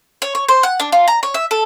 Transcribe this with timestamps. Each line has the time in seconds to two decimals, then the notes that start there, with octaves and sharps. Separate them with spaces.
0.22 C#5
0.35 C#5
0.49 C5
0.63 F#5
0.80 D4
0.92 F4
1.08 A#5
1.23 C#5
1.34 E5
1.51 A4